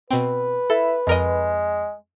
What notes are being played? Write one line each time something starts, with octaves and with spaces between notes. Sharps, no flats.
B2 C4 B4
E4 A4
F2 G#3 A#4 D#5